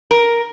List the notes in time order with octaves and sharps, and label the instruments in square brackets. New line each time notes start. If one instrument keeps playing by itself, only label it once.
[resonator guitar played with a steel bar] A#4